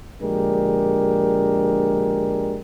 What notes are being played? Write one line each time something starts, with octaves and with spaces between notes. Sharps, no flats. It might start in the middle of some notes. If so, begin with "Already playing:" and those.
A#1 D3 G#3 D4 G4 A#4